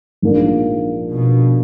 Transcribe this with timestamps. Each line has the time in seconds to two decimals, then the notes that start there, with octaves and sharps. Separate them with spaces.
0.22 A#1 G#2 F3 A#3 D4
1.12 B2